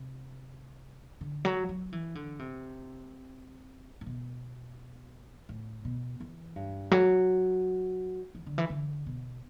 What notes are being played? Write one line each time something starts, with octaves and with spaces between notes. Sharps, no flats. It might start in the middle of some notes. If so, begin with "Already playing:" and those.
Already playing: C3
D3
F#3
F#3
E3
D3
C3
A2
B2
A2
B2
E3
G2
F#3
E3
D3
E3
D3
B2